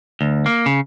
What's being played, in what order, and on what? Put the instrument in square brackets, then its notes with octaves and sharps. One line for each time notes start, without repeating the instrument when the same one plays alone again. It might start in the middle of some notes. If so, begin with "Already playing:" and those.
[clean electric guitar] D2
A#3
C#3